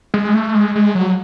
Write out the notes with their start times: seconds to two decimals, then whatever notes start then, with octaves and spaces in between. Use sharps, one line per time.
0.14 G#3
0.34 A3
0.55 G#3
0.76 G#3
0.95 F#3